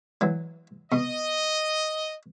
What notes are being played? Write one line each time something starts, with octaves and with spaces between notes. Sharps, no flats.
E3 F#3
B2 D#5